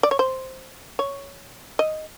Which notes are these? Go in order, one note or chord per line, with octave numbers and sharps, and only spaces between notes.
D5
C#5
C5
C#5
D#5